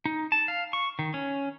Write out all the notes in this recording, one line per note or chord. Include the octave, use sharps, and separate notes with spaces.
D#4
A5
F5
C#6
D#3
C#4